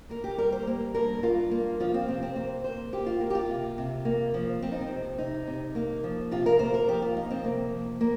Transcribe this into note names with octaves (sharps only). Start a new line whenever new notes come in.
A#3 A#4
G4
G3 A#4
C5
A#3
G2 A#4
G2 F4
A#3
F3 F4
C4
C3 C4
C4
A#3 C5
A#3 C5
A#3 G4
F4
A#3
G4
F4
C3
C3
A#3
F3
F3 C4
D#4
C4
C3
C3 D#4
C3
A#3
F3
C3 F4
A#4
A#3 C5
A#4
F3 G4
F4
A#3 D#4
C4
C3 A#3
F3
A#3